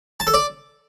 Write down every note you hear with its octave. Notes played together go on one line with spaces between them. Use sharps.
A5
A4
D5